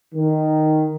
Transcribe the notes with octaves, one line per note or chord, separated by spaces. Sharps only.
D#3